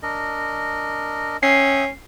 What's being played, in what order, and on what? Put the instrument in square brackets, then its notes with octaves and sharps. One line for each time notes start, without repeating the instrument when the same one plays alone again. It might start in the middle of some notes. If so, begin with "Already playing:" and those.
[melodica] D4 A#4 D#5
[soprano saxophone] C#4 [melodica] E5 G5 D#6 [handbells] C7